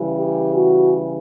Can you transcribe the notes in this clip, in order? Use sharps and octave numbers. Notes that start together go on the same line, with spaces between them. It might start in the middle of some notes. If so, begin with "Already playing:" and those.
Already playing: C#3 E3 G3
G4
F#4